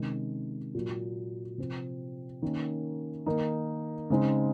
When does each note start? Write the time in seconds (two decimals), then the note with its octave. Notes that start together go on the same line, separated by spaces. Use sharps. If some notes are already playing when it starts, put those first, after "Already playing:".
Already playing: C3 D#3 G#3 C#4
0.75 A#2 F#3 A#3
1.58 C3 F3 C4
2.42 D#3 A#3 C#4
3.26 D#3 A#3 D#4
4.10 C#3 G#3 C4 D#4